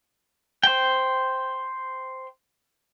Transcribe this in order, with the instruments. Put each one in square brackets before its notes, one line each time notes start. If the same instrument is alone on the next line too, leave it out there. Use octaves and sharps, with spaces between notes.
[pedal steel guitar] C5 G5